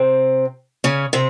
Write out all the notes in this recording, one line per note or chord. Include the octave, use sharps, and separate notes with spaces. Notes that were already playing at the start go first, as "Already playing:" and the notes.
Already playing: C3 C4
C#3 C#4
C3 C4